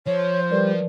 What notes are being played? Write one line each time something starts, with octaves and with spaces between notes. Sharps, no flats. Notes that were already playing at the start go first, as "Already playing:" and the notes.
F3 C5 C#5
G3 A#4 B4 D5